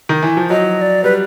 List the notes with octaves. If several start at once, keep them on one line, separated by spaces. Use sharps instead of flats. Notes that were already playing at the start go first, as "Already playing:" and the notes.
D#3
E3
F3
F#3 D#5
D5
G3 B4